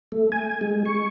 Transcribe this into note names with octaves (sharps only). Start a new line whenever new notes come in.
A3
G#5
G#3
C#6